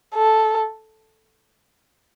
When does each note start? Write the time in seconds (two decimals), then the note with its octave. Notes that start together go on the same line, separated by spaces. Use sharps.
0.15 A4